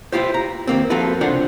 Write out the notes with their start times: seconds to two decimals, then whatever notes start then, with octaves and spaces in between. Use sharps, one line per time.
0.12 E4 F4 G4 C5
0.34 A#5
0.67 D#2 A#3 C4
0.90 F3 A#3 C4 F#4 A4 B4
1.21 C#2 C3 D4 F4 C5 F#5